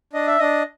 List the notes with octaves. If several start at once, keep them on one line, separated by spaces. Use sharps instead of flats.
D4 D#5
E5
D4 D#5